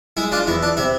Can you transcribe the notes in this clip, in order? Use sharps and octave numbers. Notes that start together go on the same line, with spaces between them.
G#3 E4
D4 F4
E2 E4
D4
C3 E4